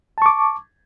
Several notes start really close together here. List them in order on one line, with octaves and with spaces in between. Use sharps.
A5 C#6 D6